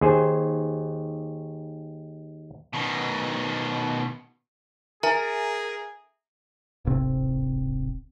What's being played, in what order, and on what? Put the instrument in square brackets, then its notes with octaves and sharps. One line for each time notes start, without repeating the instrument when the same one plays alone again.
[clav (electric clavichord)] D#2 G#4 C5 G#5
[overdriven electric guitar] B2 D#3
[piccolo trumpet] G#4 [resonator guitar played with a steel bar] A#4 [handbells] E5 G#5 A#5
[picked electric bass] D1 G#1 C3 C4